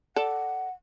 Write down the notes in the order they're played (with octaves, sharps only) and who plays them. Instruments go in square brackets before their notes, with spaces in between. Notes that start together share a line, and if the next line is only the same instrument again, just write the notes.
[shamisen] A4 D5 [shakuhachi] F#5